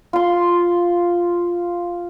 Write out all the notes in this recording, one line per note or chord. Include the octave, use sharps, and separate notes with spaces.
F4 C6